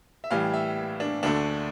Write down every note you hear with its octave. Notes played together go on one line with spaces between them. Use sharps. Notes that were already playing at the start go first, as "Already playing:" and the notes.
E5
A2 E3 G3 F5
E5
D4
D2 D3 A3 D4